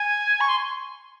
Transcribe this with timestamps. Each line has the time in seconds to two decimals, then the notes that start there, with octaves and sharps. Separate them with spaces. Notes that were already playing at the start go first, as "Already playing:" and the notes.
Already playing: G#5
0.40 C#6
0.48 C6